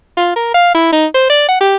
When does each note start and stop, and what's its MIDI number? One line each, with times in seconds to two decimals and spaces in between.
0.17 0.33 65
0.36 0.51 70
0.54 0.72 77
0.75 0.92 64
0.92 1.06 63
1.14 1.27 72
1.30 1.48 74
1.48 1.58 78
1.61 1.76 67